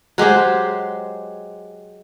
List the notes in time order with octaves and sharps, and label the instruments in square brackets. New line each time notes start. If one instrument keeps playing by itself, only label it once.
[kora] F#3 G#3 G4 C5